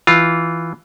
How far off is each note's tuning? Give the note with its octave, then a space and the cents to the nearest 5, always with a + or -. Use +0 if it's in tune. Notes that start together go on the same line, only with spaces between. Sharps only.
E3 +0 F4 +0